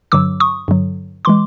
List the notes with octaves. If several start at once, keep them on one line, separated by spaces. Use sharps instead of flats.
G2 D3 F#3 D6 E6
C#6 D#6
G2 D3 F#3
E3 G#3 C6 D6